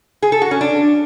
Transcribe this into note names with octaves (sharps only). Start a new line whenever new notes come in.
G#4
A4
F#4
C#4
D4